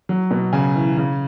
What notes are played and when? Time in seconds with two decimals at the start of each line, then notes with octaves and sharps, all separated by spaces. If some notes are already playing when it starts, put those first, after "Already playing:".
0.09 F#3
0.31 B2
0.53 C#3 G#5
0.75 E3
0.97 C#3